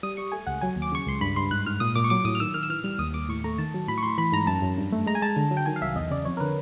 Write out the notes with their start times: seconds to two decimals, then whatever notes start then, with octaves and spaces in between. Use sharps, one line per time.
0.03 G3 D#6
0.17 G3 C#6
0.32 A3 G#5
0.47 C#2 F#5
0.61 F#3 G#5
0.76 D#2
0.82 D6
0.92 C#3 C#6
1.06 C#2 C6
1.21 G2 B5
1.36 G2 C6
1.51 G#2 F#6
1.66 G#2 F6
1.80 A#2 D#6
1.95 A#2 D6
2.04 C#6
2.10 F#3 D6
2.25 A2 D#6
2.35 F6
2.40 D#3 E6
2.54 D#3 F6
2.63 E6
2.69 E3 F6
2.84 G3 F6
2.99 D#2 D#6
3.14 D#2 D6
3.28 A2 C#6
3.44 A3 A#5
3.58 D#3 A5
3.74 F#3
3.88 A2 B5
3.98 C#6
4.03 A2 C6
4.18 E3 B5
4.32 G#2 A#5
4.47 F#2 A5
4.62 F#2
4.78 G2
4.92 A3
5.07 G#3 A#5
5.15 G#5
5.22 G#3 A5
5.37 D3
5.51 F#3
5.57 G5
5.66 D#3 G#5
5.76 F5
5.81 C2 E5
5.96 E2 D#5
6.10 C#3 D5
6.25 F2 C#5
6.37 A#4
6.40 D3 B4